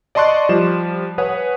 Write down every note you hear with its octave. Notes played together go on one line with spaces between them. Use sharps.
D5 D#5 A5 C6 C#6 F#6
F3 G3 E7
B4 C#5 F#5 G#5 D#6